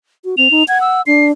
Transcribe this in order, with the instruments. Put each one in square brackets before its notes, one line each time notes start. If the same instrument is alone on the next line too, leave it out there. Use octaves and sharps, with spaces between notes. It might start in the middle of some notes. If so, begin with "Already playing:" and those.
[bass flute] F#4
[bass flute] C4 [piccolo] F7
[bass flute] D#4
[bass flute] F#5 [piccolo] G#6
[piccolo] E6
[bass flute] D4 [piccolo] C7